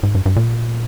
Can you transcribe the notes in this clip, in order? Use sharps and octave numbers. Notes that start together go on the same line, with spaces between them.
G#2
G2
G2
A#2